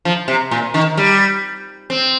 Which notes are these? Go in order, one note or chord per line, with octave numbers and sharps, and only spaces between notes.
F3
C3
A#2
D#3
G3
C4